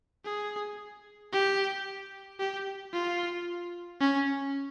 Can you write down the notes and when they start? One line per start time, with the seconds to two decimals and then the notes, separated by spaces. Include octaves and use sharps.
0.25 G#4
1.33 G4
2.39 G4
2.93 F4
4.00 C#4